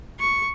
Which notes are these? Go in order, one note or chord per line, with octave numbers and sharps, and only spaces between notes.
C#6